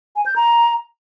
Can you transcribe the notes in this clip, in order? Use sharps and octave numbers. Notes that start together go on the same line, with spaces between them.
G#5
G6
A#5